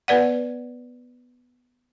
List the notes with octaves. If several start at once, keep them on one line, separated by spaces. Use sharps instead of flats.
B3 B4 D5 F#5